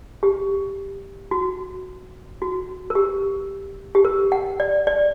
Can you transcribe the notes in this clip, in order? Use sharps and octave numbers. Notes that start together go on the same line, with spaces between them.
G4
F#4
F#4
A#4
G4
G4
A#4
F#5
D5
D5